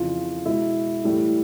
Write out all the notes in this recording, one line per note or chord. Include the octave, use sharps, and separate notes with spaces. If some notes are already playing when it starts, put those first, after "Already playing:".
Already playing: F2 C#3 E3 F4
B2 G#3 E4
A2 E3 G3